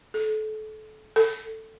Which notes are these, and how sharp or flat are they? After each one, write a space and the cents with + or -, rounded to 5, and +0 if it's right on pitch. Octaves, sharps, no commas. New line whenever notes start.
A4 -30
A4 +10